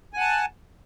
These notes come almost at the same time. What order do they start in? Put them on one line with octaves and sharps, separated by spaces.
G#5 F#5 A5